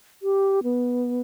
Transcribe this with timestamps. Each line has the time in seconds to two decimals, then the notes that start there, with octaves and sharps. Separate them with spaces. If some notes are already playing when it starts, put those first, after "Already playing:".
0.22 G4
0.63 B3